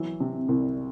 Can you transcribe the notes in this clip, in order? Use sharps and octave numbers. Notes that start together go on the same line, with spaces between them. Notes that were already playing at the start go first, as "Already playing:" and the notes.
Already playing: E3 F#3
C3
C2